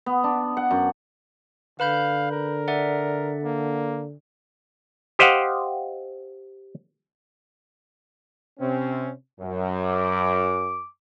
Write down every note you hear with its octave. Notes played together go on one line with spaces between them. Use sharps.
B3
D4
F#5
F#2
D3 B4 F5 B5 G6
A#4
D5 E5 F#5
A#3
G4 C5 D#5 F5 F#5
C3 C4 C#4
F#2
D6